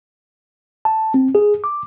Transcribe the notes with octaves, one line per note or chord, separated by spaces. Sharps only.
A5
C4
G#4
D6